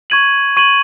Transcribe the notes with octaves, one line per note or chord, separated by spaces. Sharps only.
C#6 G#6 D#7 F#7
C#6 G#6 D#7 F#7